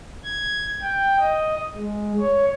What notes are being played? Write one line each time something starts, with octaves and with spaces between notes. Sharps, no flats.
G#6
G5
D#5
G#3
C#5